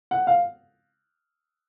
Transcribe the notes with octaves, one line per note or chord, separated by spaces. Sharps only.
F#5
F5